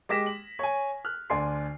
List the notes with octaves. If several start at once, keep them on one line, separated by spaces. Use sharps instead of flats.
G#3 G4 D6 A#6 B6 E7
F#7
C#5 G#5
F6 F#6
D2 D5 G#5 C6 C7